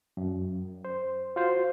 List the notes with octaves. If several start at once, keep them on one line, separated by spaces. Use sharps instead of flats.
F#2
C5
F4 F#4 C5